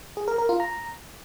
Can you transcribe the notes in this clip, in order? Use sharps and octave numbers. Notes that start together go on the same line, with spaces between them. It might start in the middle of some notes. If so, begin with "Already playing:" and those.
G#4
A#4
A#4
F4
A#5